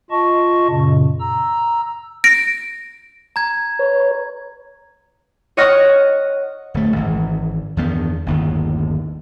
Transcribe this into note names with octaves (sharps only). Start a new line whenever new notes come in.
F4 D#5 A5 C#6
F#2 A#2 C#3
A#5 E6
A#6 D7
A#5 G#6
B4 C#5
C#5 D#5 F#5 C#6 F6 A#6
D1 A3
G#1 E3
E2 G2 D#3 B3
G1 D#2 A2